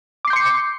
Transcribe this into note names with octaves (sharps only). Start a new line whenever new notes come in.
C6 D6 G6 C7 C#7